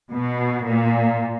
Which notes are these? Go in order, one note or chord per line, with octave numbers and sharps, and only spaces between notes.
B2
A#2